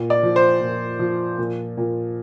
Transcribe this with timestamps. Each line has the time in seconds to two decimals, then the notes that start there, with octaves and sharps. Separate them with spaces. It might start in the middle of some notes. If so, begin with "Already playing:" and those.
Already playing: A#2
0.10 D5
0.23 F3
0.36 C5
0.61 A#2
0.99 F3
1.38 A#2
1.77 A#2